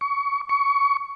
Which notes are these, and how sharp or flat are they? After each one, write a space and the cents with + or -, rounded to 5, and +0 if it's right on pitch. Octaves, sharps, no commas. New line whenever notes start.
C#6 +25
C#6 +20